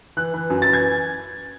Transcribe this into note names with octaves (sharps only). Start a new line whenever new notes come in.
E3 F#6
E3
F#2
A6
E3
G#6